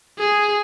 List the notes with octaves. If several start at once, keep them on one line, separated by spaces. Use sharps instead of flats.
G#4